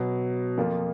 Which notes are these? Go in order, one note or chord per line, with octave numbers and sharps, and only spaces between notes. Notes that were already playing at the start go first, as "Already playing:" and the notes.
Already playing: B2 F#3 B3
F2 F3 A#3 F4 A#4